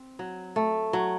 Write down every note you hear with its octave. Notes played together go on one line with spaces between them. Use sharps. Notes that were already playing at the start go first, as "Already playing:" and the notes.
Already playing: C4
F#3
A3
F#3